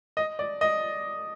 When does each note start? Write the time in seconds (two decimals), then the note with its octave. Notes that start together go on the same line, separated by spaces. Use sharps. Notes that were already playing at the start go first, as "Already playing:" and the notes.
0.17 D#5
0.39 D5
0.61 D#5